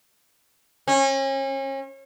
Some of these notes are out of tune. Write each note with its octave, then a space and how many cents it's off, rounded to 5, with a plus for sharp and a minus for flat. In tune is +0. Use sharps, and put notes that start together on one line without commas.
C#4 -35